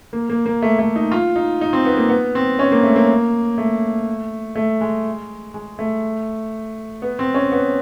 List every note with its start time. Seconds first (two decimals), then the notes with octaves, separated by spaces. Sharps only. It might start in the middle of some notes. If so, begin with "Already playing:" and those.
0.13 A#3
0.29 A#3
0.46 A#3
0.62 A3
0.79 A3
0.96 D#4
1.12 F4
1.36 D#4
1.61 D#4
1.73 C4
1.85 B3
1.97 A#3
2.09 B3
2.35 C4
2.59 C#4
2.72 A#3
2.83 A3
2.96 A#3
3.58 A3
4.55 A3
4.81 G#3
5.54 G#3
5.79 A3
7.02 B3
7.19 C4
7.34 C#4
7.52 B3